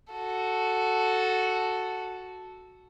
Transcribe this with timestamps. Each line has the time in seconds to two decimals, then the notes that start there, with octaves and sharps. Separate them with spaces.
0.13 F#4 A4